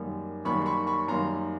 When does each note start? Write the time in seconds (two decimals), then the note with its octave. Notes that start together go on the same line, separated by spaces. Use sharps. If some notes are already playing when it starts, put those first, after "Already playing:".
Already playing: F#2 D#3 G3 A#3
0.45 F#2 D#3 G3 A#3 B5 C#6
0.62 C6
0.66 B5 C#6
0.87 B5 C#6
1.08 F#2 D#3 G3 A#3 A#5 C6